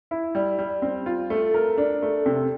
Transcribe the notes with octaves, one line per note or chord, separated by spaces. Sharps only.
E4
G3
G3
C4
F4
A3
A#4
D4
A3
C3